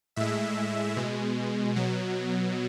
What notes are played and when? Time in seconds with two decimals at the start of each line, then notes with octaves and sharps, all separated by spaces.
0.16 A2 G#3 E5
0.97 B2 G#3
1.76 B2 F#3